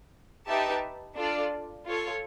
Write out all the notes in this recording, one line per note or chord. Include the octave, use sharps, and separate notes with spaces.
D#4 G4 B4 E5 A5
D4 F4 A4 D5
F4 A4 C#5